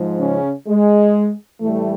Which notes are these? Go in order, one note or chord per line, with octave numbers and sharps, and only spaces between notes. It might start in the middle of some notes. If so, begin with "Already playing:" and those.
Already playing: G#2 F3 G#3
C#3 C#4
G#3
A2 E3 G3 A3